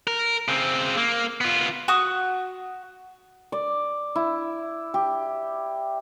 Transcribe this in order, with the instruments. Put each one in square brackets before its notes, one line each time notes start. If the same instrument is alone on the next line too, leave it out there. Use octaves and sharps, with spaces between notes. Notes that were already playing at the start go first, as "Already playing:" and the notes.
[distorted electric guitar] A#4
C#3 C4
A#3
B3 F4
[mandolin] F#4 C#6 D#6
[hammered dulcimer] D5
E4
G4